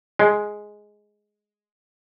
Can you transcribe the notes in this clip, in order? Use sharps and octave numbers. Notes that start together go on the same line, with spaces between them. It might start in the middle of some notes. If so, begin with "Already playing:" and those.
G#3